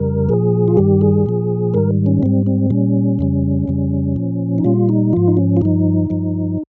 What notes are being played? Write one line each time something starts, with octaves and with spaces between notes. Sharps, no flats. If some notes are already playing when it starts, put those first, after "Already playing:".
Already playing: F2 C#3 G3 A#4
A#2 F3 G#4
F4
G2 D#3 G3 G4
G#4
A#2 F3
G#2 D#3 G3 A#4
C#4
G#2 G3 C4
C4
A#2 G3 C#4
F2 C#3 G3
F2 C#3 G3
A#2 F3
D#4
A#2 G3 F4
D#4
G#2 F3 F4
D#4
C#4
F4
G2 F3 D#4
G2 F3